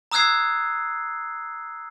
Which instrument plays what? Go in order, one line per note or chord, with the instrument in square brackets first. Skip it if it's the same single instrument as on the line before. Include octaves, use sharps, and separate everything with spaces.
[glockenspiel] A#5 D#6 E6 F#6 G#6 C7